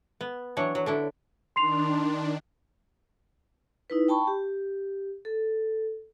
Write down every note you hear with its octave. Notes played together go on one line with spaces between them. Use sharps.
B3
E3 F#3 D4 C#5
F#3
D3 D4 E4
D#3 D4 C6 C7 F7
D#4 E4 B4
G5 A5 B5 C#6
G4
A4